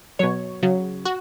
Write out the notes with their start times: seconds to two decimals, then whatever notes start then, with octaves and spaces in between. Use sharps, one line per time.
0.19 B2 F#3 C#5
0.62 C#3 F#3
1.05 F#4